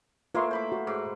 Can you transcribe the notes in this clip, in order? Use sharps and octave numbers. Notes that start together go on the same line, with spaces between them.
A2 A#3 F4 B4 E5 C6 C#6
C5 B5 D6
F#4
G#2 D6